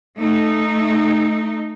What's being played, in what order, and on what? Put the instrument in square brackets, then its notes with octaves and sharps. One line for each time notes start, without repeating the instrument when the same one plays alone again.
[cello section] A3 D#4